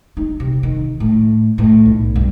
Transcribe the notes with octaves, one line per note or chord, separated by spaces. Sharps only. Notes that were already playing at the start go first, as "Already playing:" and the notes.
D#4
C3
D#3
A2
A2
B1
G2